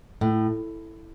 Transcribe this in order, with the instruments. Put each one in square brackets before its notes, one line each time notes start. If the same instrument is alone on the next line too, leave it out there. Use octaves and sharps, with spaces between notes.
[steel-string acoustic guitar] A2